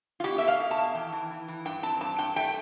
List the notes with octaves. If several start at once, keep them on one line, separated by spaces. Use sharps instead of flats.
F4
B2 G4
A3 E5
F5
B2
A5
B2
E3 G5
E3
E3
E3
G2 G5
C4 A5
G2 A5
G2 G5
A3 G5